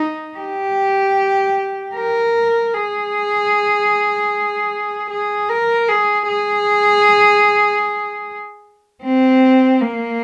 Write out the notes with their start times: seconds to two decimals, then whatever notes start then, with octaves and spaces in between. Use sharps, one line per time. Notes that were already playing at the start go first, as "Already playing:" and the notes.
Already playing: D#4
0.38 G4
1.95 A#4
2.74 G#4
5.10 G#4
5.50 A#4
5.88 G#4
6.28 G#4
9.03 C4
9.81 A#3